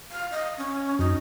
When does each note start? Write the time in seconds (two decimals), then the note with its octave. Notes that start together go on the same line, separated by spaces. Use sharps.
0.11 F5
0.31 D#5
0.58 C#4
0.99 F#2 D#4